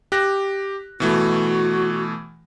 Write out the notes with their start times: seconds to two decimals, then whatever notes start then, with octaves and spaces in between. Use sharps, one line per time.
0.12 G4 F#6 A#6
1.00 B2 E3 A3 F#4